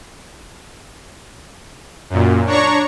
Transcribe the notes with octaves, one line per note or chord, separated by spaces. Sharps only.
F#2 A#2
D4 C#5 A#5 C#6